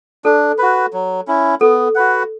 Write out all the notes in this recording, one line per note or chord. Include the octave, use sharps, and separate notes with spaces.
D4 A4
F#4 B4
F#3
C#4 E4
B3 A4
F#4 B4 F#5